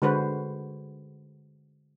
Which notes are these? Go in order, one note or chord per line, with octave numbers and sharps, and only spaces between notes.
D3 G#3 F#4 B4 C5